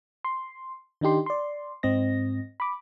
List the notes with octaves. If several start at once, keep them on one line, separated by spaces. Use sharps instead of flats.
C6
D#3 D4 D#4 G4 C6
D5 C6
G#2 C4 D#5 A#6
B5 D6